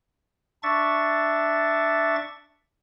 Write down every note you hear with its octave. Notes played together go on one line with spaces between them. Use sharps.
D4 E5 C#6 A6